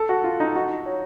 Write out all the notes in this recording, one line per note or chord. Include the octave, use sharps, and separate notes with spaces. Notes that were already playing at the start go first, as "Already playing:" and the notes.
Already playing: A4
F#4
F4
D#4
F#4
C#5